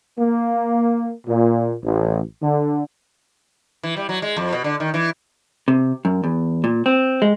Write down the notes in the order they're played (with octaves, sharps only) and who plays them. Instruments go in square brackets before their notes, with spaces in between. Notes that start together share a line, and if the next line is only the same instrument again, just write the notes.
[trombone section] A#3
A#2
A1
D3
[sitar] E3
G3
F#3
G#3
F2
B2
D3
D#3
E3
[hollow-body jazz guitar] C3
F#2
E2
A#2
C4
G#3